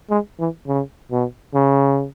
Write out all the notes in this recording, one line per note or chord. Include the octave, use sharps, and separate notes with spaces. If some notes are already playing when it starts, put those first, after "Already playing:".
G#3
E3
C#3
B2
C#3